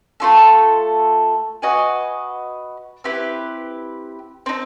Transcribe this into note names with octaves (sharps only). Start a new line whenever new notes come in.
A3 C#4 F4 A4
F#4 B4 D#5 G#5
C4 E4 G4 B4
C4 D#4